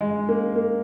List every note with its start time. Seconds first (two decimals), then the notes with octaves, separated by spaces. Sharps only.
0.01 G#3
0.29 A#3
0.56 A#3